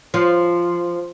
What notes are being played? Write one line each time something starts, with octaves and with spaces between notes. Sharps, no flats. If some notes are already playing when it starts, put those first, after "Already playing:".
F3